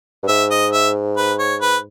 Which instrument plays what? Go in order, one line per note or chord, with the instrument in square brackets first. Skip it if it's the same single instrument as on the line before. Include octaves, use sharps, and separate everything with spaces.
[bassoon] G2
[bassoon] G#2 [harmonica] E5
[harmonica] D#5
E5
B4
C#5
B4